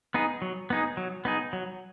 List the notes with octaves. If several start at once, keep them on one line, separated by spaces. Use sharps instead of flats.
B3 D#4 G#4
F#3
B3 D#4 G#4
F#3
B3 D#4 G#4
F#3